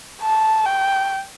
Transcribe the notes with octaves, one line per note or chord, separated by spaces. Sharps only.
A5
G5